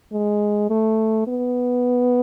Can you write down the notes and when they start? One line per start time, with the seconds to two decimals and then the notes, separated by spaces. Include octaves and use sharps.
0.13 G#3
0.70 A3
1.27 B3